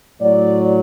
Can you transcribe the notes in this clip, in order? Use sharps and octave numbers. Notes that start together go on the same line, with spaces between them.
A2 F#3 D5